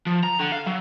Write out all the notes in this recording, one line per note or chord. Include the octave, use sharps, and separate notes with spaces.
F3
A#5
D3
F5
F#3